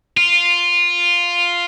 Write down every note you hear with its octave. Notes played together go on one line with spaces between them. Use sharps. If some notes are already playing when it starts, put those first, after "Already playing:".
F4